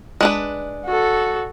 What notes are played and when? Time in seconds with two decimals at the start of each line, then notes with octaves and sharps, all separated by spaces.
0.21 G#3 D4 B4
0.85 F#4 A4